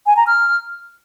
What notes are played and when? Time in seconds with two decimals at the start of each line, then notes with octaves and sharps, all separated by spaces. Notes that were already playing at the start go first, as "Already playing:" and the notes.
0.06 G#5
0.17 A#5
0.27 F6